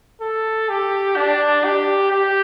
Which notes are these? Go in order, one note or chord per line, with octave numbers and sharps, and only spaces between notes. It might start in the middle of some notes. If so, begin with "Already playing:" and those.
A4
G4
D4
G4
G4